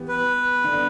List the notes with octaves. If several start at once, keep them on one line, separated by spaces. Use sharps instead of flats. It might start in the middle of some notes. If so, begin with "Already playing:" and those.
Already playing: E3 B3 G4
B4
D3 B3 D4